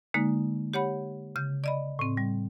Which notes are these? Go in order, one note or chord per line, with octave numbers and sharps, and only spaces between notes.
D3 G#3 A#3 D#4
G4 C#5 F#5 B5
C#3 G6
D5 D#5 B5
A2 C4
G3